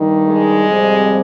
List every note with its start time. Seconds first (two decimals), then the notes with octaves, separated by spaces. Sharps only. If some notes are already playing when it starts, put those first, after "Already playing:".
Already playing: G2 D#3 G3
0.27 G#3
0.66 F2 C3 G3